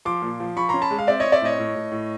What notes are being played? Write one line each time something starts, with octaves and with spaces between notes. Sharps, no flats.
F3 C6 D6
A#2
F3
F3 B5 C#6
C#4 A#5 C6
A5 B5
G#3
F5
C4 D5 E5
C4 C#5 D#5
D5 E5
A2 C#5 D#5
A2
A2
A2